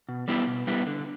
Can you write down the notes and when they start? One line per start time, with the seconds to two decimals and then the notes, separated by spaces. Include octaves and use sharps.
0.09 B2
0.28 G3 B3 E4 G4
0.47 B2
0.67 G3 B3 E4 G4
0.87 D3